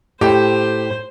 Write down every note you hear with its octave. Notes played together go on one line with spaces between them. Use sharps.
A2 G4 C5